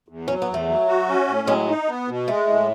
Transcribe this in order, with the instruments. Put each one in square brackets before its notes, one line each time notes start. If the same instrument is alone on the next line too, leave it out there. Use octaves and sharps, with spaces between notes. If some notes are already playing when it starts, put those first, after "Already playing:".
[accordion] E2
[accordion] F#3 [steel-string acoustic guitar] C#4
[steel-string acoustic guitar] B3
[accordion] E2
[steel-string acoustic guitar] A3
[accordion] F#3
F#4
C#4
A2
[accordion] F#3 [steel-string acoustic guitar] G#3
[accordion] D#4
B3
B2
[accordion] G#3 [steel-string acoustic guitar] A3
[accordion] A2